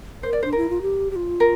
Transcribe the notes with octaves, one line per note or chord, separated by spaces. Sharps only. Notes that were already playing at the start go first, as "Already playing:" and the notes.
A#4 C5
D5
D4 C5
E4 A#4
F4
G4
G4
F4
A#4